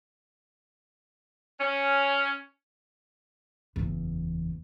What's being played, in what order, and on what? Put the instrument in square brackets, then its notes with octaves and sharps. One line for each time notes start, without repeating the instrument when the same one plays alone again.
[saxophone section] C#4
[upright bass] F#1 E2